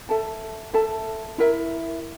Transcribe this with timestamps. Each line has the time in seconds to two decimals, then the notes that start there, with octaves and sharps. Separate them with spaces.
0.09 A4 E5 A5
0.73 A4 E5 A5
1.38 E4 A#4 E5